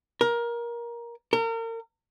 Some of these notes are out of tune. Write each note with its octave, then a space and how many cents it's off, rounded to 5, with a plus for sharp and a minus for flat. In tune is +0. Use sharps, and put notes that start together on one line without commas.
A#4 +20
A#4 -35